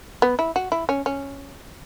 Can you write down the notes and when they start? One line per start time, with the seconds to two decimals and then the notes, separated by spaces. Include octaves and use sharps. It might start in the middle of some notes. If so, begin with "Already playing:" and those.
0.22 B3
0.39 E4
0.56 F#4
0.72 E4
0.89 C#4
1.06 C#4